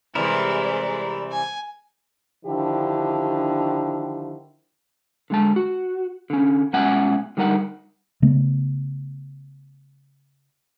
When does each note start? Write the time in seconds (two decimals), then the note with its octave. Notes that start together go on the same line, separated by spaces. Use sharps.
0.15 C3 E3 G3 G#3 E4 A#4 D5
1.32 G#5
2.46 D3 D#3 F3 D4 E4 G4
5.30 D3 G#3 A5
5.56 F#4
6.30 D3 C#4
6.73 B2 G#3 C#4 E5 F#5 G#5
7.37 D3 G3 D#4 A#4 F#5
8.22 C#3 A3 B3